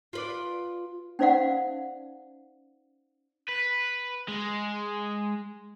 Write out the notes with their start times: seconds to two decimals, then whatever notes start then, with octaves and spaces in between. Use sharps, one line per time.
0.13 F4 B4 D5
1.19 C#4 D#4 C5 D5 F5 F#5
3.49 B4
4.28 G#3